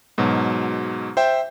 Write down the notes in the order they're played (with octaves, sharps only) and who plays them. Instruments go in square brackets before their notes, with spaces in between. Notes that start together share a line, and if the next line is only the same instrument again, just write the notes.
[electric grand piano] G#2 B2 F#3
C5 E5 G5